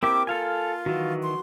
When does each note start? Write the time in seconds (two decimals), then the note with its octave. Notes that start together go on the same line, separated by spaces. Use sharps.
0.03 C4 E4 G4 A#4 D6
0.27 F4 A4 F5 G#5
0.86 D#3 E3 F#4
1.23 C6